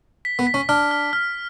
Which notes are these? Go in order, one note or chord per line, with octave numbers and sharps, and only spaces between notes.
B6
B3
B6
C#4
D4 F6
F6
F6